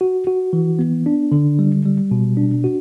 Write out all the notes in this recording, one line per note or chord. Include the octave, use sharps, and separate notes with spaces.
F#4
F#4
E3
B3
D4
D3
G3
G3
B2
D4
F#4